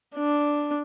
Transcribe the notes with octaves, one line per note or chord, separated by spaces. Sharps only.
D4